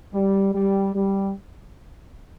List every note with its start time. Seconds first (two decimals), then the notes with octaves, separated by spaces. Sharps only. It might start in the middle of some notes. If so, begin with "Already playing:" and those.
0.14 G3
0.54 G3
0.95 G3